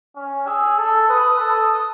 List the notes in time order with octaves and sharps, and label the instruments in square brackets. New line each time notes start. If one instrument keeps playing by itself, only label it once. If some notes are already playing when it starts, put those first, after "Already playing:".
[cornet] C#4
[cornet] G#4 [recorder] E6
[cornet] A4
[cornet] B4 [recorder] D#6
[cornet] A4
[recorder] D#6